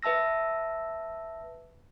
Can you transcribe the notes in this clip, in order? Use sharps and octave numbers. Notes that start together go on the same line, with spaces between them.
B4 E5 A5 E6 A#6